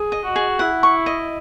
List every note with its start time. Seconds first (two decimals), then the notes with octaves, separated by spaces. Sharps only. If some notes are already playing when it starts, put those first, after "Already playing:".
Already playing: G#4
0.12 D#5
0.24 F#4
0.36 G#4
0.59 E4 F#5
0.83 C#6
1.06 D#5